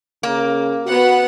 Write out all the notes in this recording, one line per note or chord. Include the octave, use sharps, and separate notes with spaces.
C#3 A#3
B3 F#4 F#5